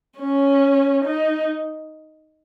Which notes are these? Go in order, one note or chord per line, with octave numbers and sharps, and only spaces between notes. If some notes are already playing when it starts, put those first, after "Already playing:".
C#4
D#4